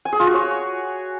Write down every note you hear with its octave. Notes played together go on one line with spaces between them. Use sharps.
G#5
G#4
F4
F#4
C#5